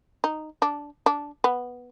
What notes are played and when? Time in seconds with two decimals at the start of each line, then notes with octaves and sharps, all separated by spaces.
0.24 D#4
0.62 D4
1.06 D4
1.44 B3